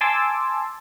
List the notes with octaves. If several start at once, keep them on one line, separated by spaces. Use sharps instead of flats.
G#5 A5 C6 D6 E6 A6